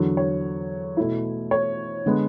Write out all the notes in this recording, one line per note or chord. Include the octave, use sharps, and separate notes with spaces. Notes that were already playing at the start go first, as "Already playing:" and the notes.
Already playing: E2 D3 F#3
C#5
B2 A3 E4
C#5
D3 G#3 B3